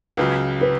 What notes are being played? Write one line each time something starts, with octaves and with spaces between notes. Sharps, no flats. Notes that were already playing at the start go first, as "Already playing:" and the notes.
C#2 C#3 F#3 B4
B4